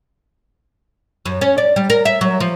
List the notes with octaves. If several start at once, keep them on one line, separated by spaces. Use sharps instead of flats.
F#2
C#4
D5
G3
A#4
E5
F#3
F3